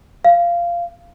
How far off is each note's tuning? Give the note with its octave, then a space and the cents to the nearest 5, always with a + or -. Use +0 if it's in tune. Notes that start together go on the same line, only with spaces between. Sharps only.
F5 -15